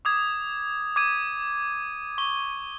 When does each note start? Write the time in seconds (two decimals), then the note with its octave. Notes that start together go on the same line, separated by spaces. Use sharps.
0.05 D6 D#6 G#6
0.96 D6 G#6 D#7
2.18 C#6 G7